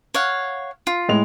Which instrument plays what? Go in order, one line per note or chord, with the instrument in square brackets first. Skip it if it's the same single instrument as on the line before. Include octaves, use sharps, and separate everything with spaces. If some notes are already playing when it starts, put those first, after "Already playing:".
[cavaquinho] C#5 F5 F#5
F4
[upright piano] A2 G#3 F7